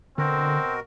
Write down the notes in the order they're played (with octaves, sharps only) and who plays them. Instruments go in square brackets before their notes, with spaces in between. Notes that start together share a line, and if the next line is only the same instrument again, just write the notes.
[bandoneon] B2 F#4 A#4 [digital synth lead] D3 [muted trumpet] C4